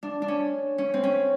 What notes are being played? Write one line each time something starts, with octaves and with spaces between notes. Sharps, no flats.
D4
D4
C#4
C#4
C4
C#4